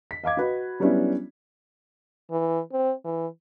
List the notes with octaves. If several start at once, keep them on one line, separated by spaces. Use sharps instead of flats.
B6
D#5 F5 D6 G#6
F#4 B4 D#5
F#3 G3 B3 C#4 D4 E4
E3
C4
E3